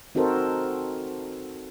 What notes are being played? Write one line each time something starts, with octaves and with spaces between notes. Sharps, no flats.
C4 D#4 F#4 A4 A#4 C5